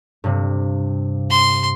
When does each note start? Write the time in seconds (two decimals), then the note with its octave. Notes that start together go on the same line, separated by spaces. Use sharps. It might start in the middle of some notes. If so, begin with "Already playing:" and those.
0.24 G2 C3
1.31 C6